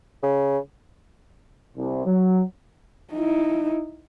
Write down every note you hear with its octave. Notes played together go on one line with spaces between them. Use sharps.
C#3
C2
F#3
D#4 E4